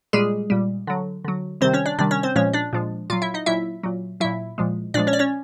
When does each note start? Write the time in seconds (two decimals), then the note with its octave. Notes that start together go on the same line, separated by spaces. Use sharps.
0.13 A#2 G3 G#3 G#4
0.50 A#2 G3
0.87 D3 F#3
1.25 D3 F#3
1.61 C3 D#3 G3 C4 C5
1.73 C#4 C#5
1.86 D4 D5
1.98 C3 D#3 G3 D4 D5
2.11 C#4 C#5
2.23 C4 C5
2.36 A#2 F3 G#3 C#4 C#5
2.53 D4 D5
2.73 A#2 F3 G#3
3.10 A#2 F#3 F4 F5
3.22 E4 E5
3.34 D#4 D#5
3.46 A#2 F#3 E4 E5
3.83 A#2 F#3
4.20 A#2 F#3 E4 E5
4.58 A#2 F3 G#3
4.94 A#2 F3 G#3 D4 D5
5.07 C#4 C#5
5.13 D5
5.19 C#4 C#5